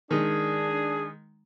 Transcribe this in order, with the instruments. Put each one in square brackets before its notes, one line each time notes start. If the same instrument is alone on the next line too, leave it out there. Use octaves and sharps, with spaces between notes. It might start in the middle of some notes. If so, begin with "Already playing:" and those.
[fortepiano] D#3 G#3 [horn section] D4 G#4